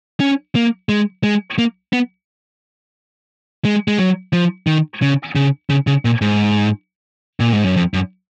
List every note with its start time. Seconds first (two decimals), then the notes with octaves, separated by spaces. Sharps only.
0.20 C#4
0.55 A#3
0.89 G#3
1.23 G#3
1.59 A#3
1.93 B3
3.65 G#3
3.88 G#3
3.99 F#3
4.33 F3
4.67 D#3
5.02 C#3
5.35 C#3
5.70 C#3
5.87 C#3
6.05 A#2
6.21 G#2
7.40 A#2
7.53 G#2
7.64 F#2
7.77 F2
7.94 F#2